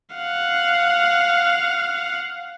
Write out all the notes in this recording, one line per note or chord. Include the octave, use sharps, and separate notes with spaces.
F5 F#5